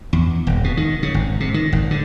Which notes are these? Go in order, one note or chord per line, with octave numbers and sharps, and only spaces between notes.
E2
D#1
B2
D#3
C#3
G#1
C3
D#3
G#1
D3